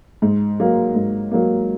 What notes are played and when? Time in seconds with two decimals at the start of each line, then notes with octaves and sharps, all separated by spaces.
0.22 G#2
0.60 F#3 A#3
0.95 G#2
1.31 F#3 A#3